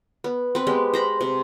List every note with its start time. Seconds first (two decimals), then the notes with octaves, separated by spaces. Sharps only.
0.24 B3
0.55 C4 B4
0.67 G#3 B3 G4
0.94 C5 A#5 B5
1.21 C3